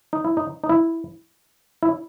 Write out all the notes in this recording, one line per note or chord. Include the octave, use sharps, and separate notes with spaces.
D#4
E4
D#4
D#4
E4
E4